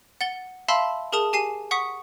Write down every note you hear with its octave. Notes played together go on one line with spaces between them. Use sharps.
F#5 A6 G7
E5 F5 A5 B5 C6 E6
G#4 A#4 A5 D#6 F7
G4 G#5 C7 D#7 E7
F#5 C#6 D#6 B6